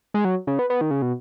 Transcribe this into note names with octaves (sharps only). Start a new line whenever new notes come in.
G#3
F#3
C#3
B3
B3
D#3
C#3
B2